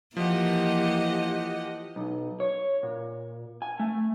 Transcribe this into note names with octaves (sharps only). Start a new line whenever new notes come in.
E3 F3 A#3 G4 D#5 F#5
B1
C#5
A#2
G#5
A3